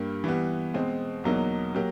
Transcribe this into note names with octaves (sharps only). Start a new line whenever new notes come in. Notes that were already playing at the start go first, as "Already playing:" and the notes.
Already playing: G2 G3 A#3
E3 G3 B3
B2 G#3 C4
E2 B2 F#3 A#3 D#4
F#3 A#3 G4